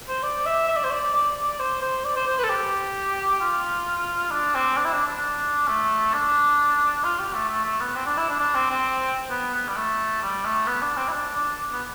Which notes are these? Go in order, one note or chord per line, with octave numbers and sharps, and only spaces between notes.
C5
D5
E5
E5
D5
C5
D5
D5
C5
C5
D5
C5
C5
B4
A4
G4
F4
D4
C4
D4
E4
D4
D4
A3
D4
F4
G4
A3
A3
A3
B3
C4
D4
E4
D4
D4
C4
C4
B3
B3
G3
A3
G3
A3
B3
D4
C4
E4
D4
D4
B3